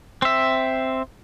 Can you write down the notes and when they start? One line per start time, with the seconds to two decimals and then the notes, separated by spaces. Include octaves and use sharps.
0.22 C4 E5